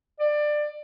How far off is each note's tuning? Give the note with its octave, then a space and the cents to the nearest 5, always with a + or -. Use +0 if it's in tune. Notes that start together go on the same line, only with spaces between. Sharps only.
D5 +20